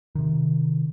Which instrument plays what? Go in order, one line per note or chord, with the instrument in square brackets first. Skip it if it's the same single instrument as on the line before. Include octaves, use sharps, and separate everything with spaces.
[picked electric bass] C3 D#3